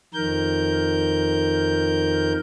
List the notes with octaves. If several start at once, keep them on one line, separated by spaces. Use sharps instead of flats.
F2 D#3 A#4 G6